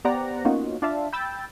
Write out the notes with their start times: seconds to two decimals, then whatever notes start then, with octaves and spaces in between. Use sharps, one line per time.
0.05 B3 G4 C5 D5 F#5 A#5
0.45 A#3 B3 C#4 D#4 F4 F#4
0.82 D4 F4 D5 E5 F5 A5
1.13 G5 B5 E6 G6 A6